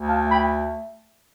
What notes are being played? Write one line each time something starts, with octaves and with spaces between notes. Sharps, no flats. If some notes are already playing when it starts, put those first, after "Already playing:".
Already playing: D2
F5 A5
A3
G5 B5